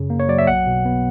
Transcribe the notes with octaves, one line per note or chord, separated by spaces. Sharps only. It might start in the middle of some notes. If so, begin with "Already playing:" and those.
Already playing: F#2 C#3
A#3
C#5
F#3 D5
E5
B1 F#5
B2
B3